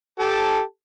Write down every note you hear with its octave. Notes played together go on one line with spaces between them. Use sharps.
G4 A4 A5